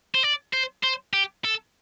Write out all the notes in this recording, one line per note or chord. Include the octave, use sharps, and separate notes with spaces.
C5
D5
C5
C5
G4
A4